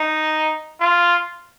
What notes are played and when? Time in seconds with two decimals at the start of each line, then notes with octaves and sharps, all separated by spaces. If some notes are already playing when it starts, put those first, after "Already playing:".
Already playing: D#4
0.81 F4